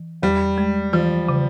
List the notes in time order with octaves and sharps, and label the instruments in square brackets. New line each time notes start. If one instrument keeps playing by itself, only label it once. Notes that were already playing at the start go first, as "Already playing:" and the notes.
Already playing: [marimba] E3
[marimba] E2 [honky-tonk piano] G3
[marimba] G#3
[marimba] E3 [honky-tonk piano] F3
[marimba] C#3